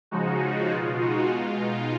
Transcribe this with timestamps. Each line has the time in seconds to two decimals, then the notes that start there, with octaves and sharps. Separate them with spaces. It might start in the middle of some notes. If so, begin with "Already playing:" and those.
0.11 C#3 F3 G#3 D#4 F#4
0.41 D#4 F#4
0.72 B2 G#3 F4
1.01 D#4 F#4
1.30 B2 G#3 F4
1.60 D#4